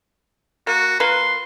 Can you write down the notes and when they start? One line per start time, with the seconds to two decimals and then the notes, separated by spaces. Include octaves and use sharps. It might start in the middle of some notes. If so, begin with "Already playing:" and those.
0.67 A#3 F#4
1.00 A#3 F4 B4 C6